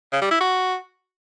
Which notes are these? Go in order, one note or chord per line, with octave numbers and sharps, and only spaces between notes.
C#3
G3
E4
F#4